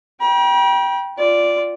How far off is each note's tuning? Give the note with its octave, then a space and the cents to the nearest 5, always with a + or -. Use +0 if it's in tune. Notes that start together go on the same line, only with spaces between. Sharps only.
G5 +0 B5 -45
F4 +0 D5 -5